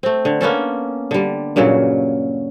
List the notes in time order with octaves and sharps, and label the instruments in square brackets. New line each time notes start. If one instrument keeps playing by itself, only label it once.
[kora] A3 C4
D3
A#3 B3 C#4 A4
D3 G3
G2 A#2 C#3 F#3